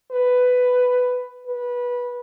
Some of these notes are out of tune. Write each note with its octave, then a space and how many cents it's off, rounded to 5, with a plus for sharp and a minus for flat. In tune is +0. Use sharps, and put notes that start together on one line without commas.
B4 +10
B4 -15